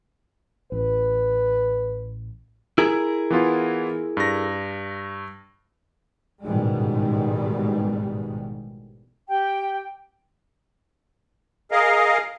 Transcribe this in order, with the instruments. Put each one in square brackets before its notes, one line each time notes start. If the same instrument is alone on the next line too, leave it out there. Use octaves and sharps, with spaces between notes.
[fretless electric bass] A1 [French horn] B4
[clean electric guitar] E4 G#4 A#4
[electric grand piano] E3 B3 F4
G2 A#6
[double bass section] A1 G#2 B2 D#3 G3 G#3
[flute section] G4 G5
[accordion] G#4 A#4 D#5 F5